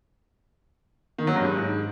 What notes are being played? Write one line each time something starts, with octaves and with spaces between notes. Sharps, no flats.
D#3
F#3
G2
G#2